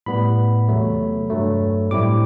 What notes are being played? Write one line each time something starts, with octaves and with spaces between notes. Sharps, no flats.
A2 G3 B3 B5
E2 C3 F#3 A3
G2 F#3 A3
A2 G3 C4 E4 D6